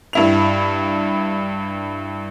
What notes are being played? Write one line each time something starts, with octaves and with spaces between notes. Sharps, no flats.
G2 E4 F7